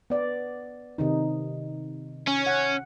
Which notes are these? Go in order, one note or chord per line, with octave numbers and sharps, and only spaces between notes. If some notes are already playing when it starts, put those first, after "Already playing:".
B3 D5
C3 D#3 D#4
C#4
F#5